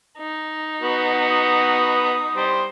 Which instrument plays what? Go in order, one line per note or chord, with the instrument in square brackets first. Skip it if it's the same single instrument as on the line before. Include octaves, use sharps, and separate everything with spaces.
[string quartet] D#4
[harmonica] B3 F#4
[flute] D#6
[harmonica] G3 C5